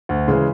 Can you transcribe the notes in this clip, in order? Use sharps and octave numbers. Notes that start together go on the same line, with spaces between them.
D2
C#3 E3 G#3